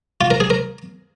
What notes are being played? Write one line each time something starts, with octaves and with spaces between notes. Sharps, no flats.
F4
A#4
G#4
A#4